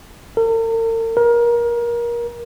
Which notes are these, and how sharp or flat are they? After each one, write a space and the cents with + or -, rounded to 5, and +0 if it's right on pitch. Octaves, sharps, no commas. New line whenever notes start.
A#4 -45
A#4 +25